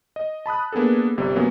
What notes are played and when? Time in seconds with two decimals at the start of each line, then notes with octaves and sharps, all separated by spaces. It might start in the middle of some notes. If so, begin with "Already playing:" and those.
0.16 D#5
0.46 A5 B5 D#6 F#6
0.72 A#3 B3 D4 G#4 A4
1.17 G1 C3 G3
1.36 F#3 A#3 B3 C#4